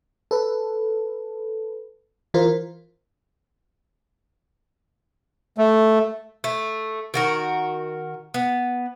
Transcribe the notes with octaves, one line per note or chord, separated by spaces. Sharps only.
A4 B4
E3 F4 A#4 C5
A3
A3
D#3 F#4 A#4
B3